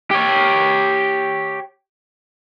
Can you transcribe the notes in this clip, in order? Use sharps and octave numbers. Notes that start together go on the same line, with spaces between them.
G4 C#5